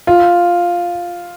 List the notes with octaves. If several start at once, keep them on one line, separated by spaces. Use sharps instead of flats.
F4